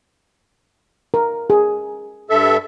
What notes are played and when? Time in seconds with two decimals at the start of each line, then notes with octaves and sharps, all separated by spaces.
1.14 A#4
1.50 G#4
2.30 G2 A4 E5